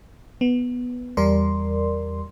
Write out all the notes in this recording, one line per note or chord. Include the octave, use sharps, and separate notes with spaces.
B3
E2 G3 A#4 D5 C6